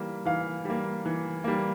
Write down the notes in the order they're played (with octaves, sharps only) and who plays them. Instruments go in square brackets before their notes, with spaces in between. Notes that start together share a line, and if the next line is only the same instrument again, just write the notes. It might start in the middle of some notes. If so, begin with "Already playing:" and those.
Already playing: [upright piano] E3 G3 A#3
E3 F5
G3 A#3
E3
G3 A#3